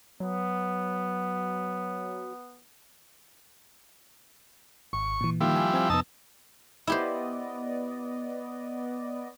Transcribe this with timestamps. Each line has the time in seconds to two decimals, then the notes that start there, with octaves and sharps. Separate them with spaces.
0.20 F#3 B3
4.93 G#1 C#6
5.21 A#2 E3
5.41 D#3 F3 G3 A#3 E4
5.56 G#5
5.74 C4 G#5
5.90 F2 C3 B3 D#4 A5 E6
6.87 B3 E4 G4 C5 D5 D#5